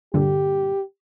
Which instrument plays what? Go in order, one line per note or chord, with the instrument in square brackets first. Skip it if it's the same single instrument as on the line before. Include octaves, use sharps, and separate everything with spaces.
[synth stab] G2 A#2 D3 [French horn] G4